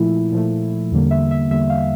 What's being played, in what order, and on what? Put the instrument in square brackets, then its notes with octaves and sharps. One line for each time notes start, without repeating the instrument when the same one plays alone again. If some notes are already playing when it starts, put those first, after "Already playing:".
Already playing: [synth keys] A#2 F3 A3 E4
A#2 F3 A3
E2 D3 G3 A#3
E5
E5
E2 D3 G3 A#3 E5
F5